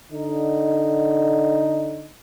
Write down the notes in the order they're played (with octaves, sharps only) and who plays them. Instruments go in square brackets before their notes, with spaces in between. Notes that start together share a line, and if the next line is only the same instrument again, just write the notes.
[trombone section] D3 D#4